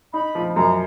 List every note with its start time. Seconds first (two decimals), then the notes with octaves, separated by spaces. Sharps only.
0.13 D#4 B5
0.35 F3
0.56 F#2 A#5